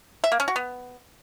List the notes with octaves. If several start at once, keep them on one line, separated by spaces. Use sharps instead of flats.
E5
A#3
C#4
F#4
B3